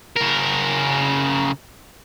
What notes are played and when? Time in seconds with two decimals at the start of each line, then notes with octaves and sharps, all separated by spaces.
0.17 C#3 A#4